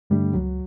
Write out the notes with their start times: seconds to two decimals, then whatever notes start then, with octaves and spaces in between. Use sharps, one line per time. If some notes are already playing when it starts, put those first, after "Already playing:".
0.10 G2 D3 G3 A3 D4
0.33 C#2 F#3